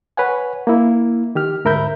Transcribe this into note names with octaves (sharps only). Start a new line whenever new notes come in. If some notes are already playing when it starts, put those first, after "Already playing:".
B4 C#5 F#5 G#5
A#3 E4
D#3 G4 F6
D2 G#2 A#4 E5 B5 G6